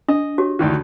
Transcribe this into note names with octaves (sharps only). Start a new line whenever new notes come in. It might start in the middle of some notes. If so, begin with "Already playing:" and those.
D4 D#5
F#4 G4 C#5
D2 D#3 E3